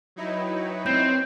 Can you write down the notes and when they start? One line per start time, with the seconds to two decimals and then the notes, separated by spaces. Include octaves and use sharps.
0.16 F#3 D#4 E4 B4 C#5 G5
0.86 C4 G6